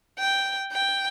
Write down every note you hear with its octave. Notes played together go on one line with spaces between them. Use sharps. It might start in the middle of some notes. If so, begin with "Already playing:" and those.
G5
G5